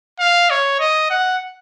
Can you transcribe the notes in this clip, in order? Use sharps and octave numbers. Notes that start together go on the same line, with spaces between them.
F5
C#5
D#5
F#5